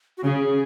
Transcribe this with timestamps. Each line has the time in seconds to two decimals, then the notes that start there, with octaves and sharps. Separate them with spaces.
0.18 F#4
0.24 C#3 G#4